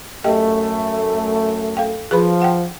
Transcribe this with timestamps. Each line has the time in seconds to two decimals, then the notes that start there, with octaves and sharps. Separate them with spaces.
0.24 F#2 A3 G4 D#5 G5
1.77 A4 F5 G5
2.11 F3 G#4 B4 B5
2.42 F#5 G5